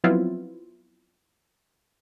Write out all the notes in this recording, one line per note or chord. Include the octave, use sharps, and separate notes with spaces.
F3 F#3 B3 C4 E4 F4